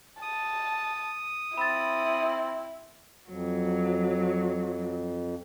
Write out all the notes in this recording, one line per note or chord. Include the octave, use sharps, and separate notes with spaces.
A5 D#6
C4 E4 B5 A6
F2 F#3